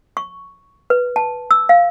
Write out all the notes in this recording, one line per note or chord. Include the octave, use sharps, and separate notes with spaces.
C#6
B4
A5
E6
F5